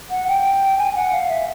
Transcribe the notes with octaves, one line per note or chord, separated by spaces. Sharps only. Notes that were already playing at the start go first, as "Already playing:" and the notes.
F#5
G5
G#5
F#5
F5
E5